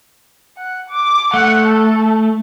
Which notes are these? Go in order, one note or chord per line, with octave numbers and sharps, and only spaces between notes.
F#5
D6
A3 F#5
A4